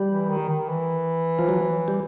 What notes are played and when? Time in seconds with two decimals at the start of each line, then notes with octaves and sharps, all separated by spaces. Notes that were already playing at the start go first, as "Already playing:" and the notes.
Already playing: G3
0.09 E3
0.29 D#3
0.49 D#3
0.69 E3
1.39 F3
1.49 F#3
1.88 G3